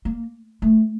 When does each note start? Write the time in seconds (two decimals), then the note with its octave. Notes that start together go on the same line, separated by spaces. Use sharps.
0.05 A#3
0.62 A3